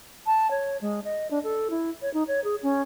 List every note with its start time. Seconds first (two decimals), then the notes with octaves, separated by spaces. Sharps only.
0.26 A5
0.51 C#5
0.81 G#3
1.04 D#5
1.31 D4
1.44 A4
1.70 E4
2.02 C#5
2.14 D#4
2.28 C#5
2.44 G#4
2.63 C#4